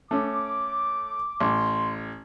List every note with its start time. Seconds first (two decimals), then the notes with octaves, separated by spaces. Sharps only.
0.11 A3 C#4 D6
1.40 A1 C6